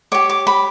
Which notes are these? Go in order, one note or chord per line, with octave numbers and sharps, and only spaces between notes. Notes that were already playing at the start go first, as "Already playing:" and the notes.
G4 C#5 D6
D6
B5